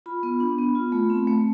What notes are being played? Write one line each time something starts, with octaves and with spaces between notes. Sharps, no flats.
F4 B5
B3
D4
B3
F4
A3
C4
A3